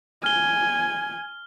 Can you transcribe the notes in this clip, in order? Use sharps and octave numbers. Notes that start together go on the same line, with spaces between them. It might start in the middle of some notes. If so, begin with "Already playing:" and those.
G#5 F6 G7